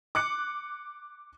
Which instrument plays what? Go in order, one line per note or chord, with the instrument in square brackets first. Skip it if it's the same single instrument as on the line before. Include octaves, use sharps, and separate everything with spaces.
[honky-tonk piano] D6 F#6 C#7